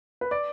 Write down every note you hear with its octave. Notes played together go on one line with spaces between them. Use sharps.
B4
D5